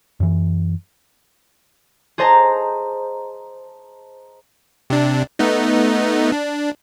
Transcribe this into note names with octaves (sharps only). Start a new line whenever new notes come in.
F#2 E3
G#4 C5 D#5 A5 A#5
C3 D4
A3 B3 D#4
D4